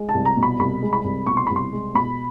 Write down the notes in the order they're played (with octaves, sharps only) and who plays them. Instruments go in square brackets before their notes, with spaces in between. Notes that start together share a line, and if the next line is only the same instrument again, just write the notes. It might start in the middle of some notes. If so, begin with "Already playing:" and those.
Already playing: [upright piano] G#3
A5
C2
A#5
B2
B5
C2 B5
G#3
B5
C2
B2 C#6
C6
C2 B5
C6
G#3
B2 B5